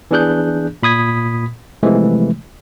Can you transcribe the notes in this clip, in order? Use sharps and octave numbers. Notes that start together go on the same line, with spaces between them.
E3 B3 D4 G#4 F#6 G6
A#2 B5 D#6 G#6 B6
C3 E3 F3 G#3 A3